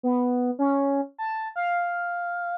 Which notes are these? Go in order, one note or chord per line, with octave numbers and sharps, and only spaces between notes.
B3
C#4
A5
F5